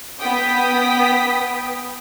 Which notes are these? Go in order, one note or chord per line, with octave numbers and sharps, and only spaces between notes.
B3 G5 D#6 B6